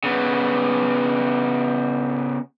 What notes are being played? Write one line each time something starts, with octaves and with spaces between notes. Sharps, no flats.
C#3 B3